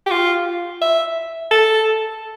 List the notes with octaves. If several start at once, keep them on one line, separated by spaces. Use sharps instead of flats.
G4
F4
E5
A4